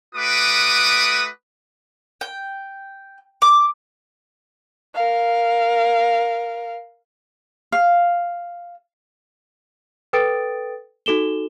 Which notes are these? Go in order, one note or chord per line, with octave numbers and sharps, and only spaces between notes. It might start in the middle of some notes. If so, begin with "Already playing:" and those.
A3 F#4 B4 D6 D#6
G5
D6
A#4 F5
F5
A4 B4 G5 D#6 A6 D7
D#4 F#4 A4 E7 G7